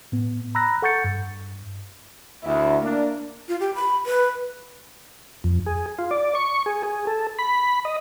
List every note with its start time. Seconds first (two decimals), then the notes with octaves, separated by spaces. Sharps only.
0.12 A2 B3
0.55 A#5 B5 E6 F#6 A#6
0.82 A4 F#5 C#6 G6 A6 C#7
1.04 G2
2.44 D2 E4
2.83 A#3 D4
3.48 F4
3.60 G4
3.75 B5
4.06 B4
5.44 F2
5.66 G#4
5.99 F4
6.11 D5
6.35 C#6
6.66 G#4
6.83 G#4
7.07 A4
7.39 B5
7.85 D#5